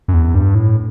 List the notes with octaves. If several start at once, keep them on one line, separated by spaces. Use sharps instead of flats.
F#2
E2
G2
A2